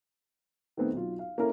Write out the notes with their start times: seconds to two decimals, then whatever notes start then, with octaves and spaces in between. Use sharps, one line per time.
0.77 D#3 A3 B3 C4
0.93 B1 F4
1.19 F5
1.38 A#3 C#4 E4 A4 A#4